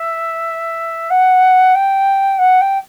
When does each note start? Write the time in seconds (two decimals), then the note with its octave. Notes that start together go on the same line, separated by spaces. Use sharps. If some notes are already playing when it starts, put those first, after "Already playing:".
Already playing: E5
1.10 F#5
1.75 G5
2.38 F#5
2.61 G5